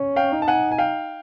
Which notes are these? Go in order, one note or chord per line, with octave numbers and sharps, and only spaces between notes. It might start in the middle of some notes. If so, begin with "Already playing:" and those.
Already playing: C#4
F5 G5
D#4
A5
F#5 G#5
G#5
F5 G5